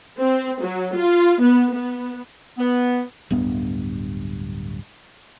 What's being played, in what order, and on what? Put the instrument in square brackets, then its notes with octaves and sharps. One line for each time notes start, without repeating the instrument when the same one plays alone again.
[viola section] C4
F#3
F4
B3
B3
[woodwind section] B3
[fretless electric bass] D1 G2 B3